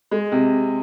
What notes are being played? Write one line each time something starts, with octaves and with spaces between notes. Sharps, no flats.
G#3
C3